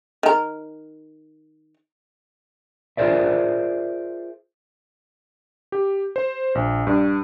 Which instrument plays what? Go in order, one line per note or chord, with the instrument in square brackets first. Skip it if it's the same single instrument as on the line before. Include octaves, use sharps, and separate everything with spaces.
[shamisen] D#3 A#4
[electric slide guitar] F4 G#4 A#4 C5 D5 E5
[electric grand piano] G4
C5
A#1
G2